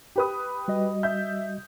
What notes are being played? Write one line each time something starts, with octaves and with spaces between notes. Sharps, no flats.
G4 B4 D#6
G3 F#4 D#5
E5 G6